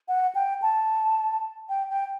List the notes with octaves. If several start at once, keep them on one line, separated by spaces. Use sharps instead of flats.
F#5
G5
A5
G5
G5